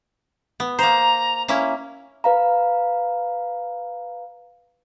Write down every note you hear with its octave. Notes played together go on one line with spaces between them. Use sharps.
B3
A#3 C5 A#5
A#3 C#4 E4
B4 F5 A#5